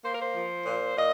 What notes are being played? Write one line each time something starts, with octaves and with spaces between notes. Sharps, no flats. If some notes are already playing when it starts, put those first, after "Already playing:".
A#3 C5
A#4
C5
F3
A#2
A#2 D#5